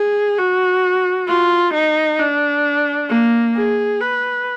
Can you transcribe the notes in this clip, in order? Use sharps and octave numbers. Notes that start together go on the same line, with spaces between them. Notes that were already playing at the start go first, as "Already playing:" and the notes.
Already playing: G#4
F#4
F4
D#4
D4
A#3
G#4
B4